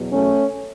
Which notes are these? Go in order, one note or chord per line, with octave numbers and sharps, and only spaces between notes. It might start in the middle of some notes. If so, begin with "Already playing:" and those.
Already playing: E2 B2 F#3
A3 C#4